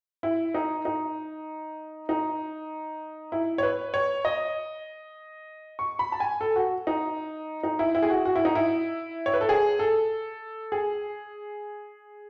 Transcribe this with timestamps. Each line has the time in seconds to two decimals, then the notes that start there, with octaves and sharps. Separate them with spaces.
0.23 E4
0.54 D#4
0.85 D#4
2.09 D#4
3.32 E4
3.58 C#5
3.63 B4
3.94 C#5
4.25 D#5
5.79 C#6
5.99 B5
6.12 A5
6.20 G#5
6.41 A4
6.56 F#4
6.87 D#4
7.63 D#4
7.79 E4
7.95 E4
8.02 G#4
8.10 F#4
8.25 F#4
8.36 E4
8.45 D#4
8.55 E4
9.26 C#5
9.34 B4
9.41 A4
9.49 G#4
9.79 A4
10.72 G#4